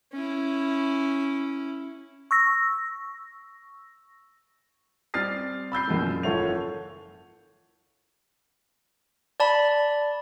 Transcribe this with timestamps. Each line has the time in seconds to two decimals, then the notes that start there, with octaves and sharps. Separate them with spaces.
0.13 C#4 E4
2.31 C#6 E6 A#6
5.14 G3 C4 D5 F6 A6 C7
5.72 B5 E6 G6 C7
5.87 A#1 F#2 B2 G#3
6.23 F#1 F4 A4 C#5 F#5 F7
9.40 D5 A5 B5